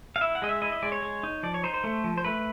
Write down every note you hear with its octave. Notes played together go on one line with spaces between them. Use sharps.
F5
E4 E5
F#5
G#3 D#5
E5
E4 D#5
D#5
G#3 D5
C#5
G#3
D#4
F3 D5
C#5
D#4 C5
C5
A3
F3
C5
A3 B4